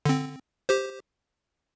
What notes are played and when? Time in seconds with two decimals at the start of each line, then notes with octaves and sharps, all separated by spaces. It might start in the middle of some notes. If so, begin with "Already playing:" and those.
0.06 D3 C4
0.69 G4 C5